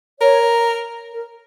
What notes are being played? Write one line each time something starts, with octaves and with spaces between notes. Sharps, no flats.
A#4 C#5
A#4